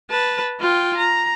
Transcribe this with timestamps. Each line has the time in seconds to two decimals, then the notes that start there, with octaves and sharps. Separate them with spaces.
0.10 B4 A5
0.60 F4 G5
0.97 A#5